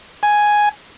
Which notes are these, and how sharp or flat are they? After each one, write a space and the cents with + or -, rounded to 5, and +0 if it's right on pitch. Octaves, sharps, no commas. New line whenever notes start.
G#5 +5